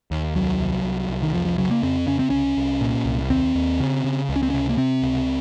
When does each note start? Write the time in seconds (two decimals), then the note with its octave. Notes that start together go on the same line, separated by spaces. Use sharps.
0.11 D#2
0.35 C2 F#3
0.59 C2
0.84 C2
1.09 C2
1.23 D#3
1.33 F2 F3
1.45 F3
1.58 C#3 F#3
1.71 A#3
1.83 F2 C4
2.07 C#3 C#4
2.19 C4
2.30 C2 C#4
2.57 C2
2.81 A#2
3.05 C2
3.30 D#2 C4
3.55 D#2
3.80 C#3
4.04 C#3
4.29 C#2
4.36 C#4
4.43 C4
4.50 C3 C#4
4.69 A#3
4.77 C3 C4
5.02 C#2